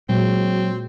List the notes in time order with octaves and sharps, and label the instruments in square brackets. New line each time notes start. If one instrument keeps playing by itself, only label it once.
[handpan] A#2 G#3 [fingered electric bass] F#3 [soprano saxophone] C4 [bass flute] F#4